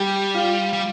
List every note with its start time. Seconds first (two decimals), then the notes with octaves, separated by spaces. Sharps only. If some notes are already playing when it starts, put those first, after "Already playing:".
Already playing: G3 G4
0.35 F4
0.73 G3